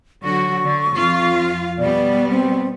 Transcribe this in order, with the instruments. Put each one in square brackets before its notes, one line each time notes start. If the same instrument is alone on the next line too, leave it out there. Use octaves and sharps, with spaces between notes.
[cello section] D3 F#3 F#4 [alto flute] C#6
[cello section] D3
F2 F4 F5
[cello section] B2 G3 B3 [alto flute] D5
[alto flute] C4